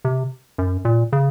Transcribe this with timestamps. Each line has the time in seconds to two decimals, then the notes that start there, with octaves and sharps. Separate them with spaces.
0.05 C3
0.58 F#2
0.85 A#2
1.13 C#3